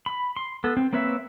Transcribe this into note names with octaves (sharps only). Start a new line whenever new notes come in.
B5
C6
B3 A4
C4
A#3 C4 B4 C#5 E5